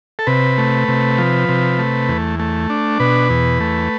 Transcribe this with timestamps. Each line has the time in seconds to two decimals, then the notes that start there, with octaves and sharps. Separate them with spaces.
0.19 A4
0.27 C3 B4
0.58 A3
0.88 C3
1.18 F3
1.49 C3
1.79 A3
2.08 E2
2.39 A3
2.70 D4
3.00 B2 B4
3.30 E2
3.60 A3